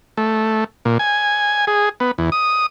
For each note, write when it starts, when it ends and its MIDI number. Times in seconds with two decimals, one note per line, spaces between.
0.17 0.64 57
0.85 0.98 46
0.99 1.65 80
1.67 1.89 68
2.00 2.11 59
2.18 2.30 40
2.32 2.66 87